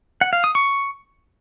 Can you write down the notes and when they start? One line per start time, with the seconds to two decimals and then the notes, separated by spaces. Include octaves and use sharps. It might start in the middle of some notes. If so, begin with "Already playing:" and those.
0.21 F#5
0.33 F5
0.44 D#6
0.55 C#6